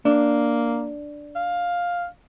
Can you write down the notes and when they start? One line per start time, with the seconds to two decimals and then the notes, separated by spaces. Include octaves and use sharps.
0.05 A#3 D4
1.36 F5